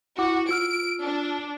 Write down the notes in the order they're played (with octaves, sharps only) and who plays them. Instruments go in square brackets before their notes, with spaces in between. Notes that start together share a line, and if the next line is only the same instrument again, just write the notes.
[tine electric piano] E4 F#5 D6 [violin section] F#4
[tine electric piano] F4 E6 F6 [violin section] D7
[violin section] D4